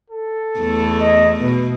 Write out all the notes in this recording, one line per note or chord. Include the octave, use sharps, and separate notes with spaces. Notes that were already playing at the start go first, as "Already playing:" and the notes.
A4
E2 A3 E4
D#5
B2 B4